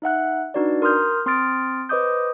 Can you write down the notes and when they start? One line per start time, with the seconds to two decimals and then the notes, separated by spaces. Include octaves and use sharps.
0.02 D#4 E5 F#5 F#6
0.54 D4 D#4 F#4 B4 D5
0.82 A#4 C6 D#6 F6 G6
1.26 C4 C6 D#6 F6 A6 D7
1.89 B4 C5 D#5 D6 D#6 G6